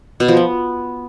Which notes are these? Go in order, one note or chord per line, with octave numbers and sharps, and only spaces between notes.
B2
F3
B3